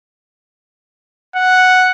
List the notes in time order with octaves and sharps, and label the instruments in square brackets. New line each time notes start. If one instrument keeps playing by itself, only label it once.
[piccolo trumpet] F#5